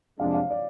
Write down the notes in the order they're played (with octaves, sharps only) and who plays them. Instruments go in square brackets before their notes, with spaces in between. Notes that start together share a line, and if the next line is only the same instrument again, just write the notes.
[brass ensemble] F2 C3 G#3 D4 [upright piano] F5
[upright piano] F5
D5